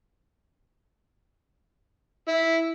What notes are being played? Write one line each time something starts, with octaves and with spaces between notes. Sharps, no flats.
E4